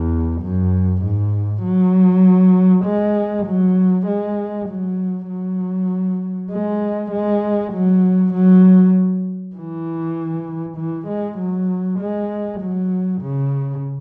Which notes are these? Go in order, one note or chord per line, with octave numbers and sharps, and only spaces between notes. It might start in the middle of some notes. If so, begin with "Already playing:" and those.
Already playing: E2
F#2
G#2
F#3
G#3
F#3
G#3
F#3
F#3
G#3
G#3
F#3
F#3
E3
E3
G#3
F#3
G#3
F#3
C#3